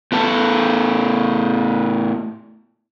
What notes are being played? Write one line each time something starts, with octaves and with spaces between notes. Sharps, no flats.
A2 B3 A4